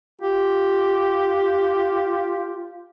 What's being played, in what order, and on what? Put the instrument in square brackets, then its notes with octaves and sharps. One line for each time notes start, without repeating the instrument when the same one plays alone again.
[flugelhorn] F4 [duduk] G4